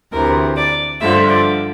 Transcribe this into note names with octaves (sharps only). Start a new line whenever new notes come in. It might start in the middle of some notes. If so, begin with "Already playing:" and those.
D2 C3 E3 A#4
D5
G2 D3 F3 E5
D5